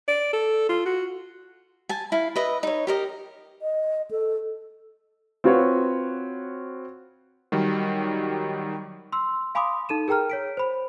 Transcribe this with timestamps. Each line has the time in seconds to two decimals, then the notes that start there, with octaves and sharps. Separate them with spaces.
0.08 D5
0.33 A4
0.69 F4
0.86 F#4
1.89 G#5 A5
2.12 E4 F5
2.36 B4 D#5 E5
2.63 D#4 C#5
2.87 G4 A#4 D#5
3.62 D#5
4.11 A4
5.44 C4 F4 F#4 B4 C#5
7.52 D#3 F#3 G3
9.13 C6 E6
9.55 F5 G#5 B5 C6 D6 D#6
9.89 D#4 A4 D#7 E7
10.08 G#4 A#4 G5 A#5 F6
10.30 C#5 B6 D7
10.57 C5 B5